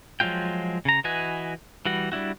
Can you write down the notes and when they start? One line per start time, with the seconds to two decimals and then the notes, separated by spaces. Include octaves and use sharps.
0.20 F3 F#3 G#3 F4 G5
0.85 C#3 A#5
1.04 E3 F#4 B4 D#5 G#5
1.85 E3 G3 F#4
2.12 G3 D4 E4 F#4